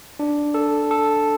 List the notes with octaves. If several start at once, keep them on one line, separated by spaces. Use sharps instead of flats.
D4
A4
A4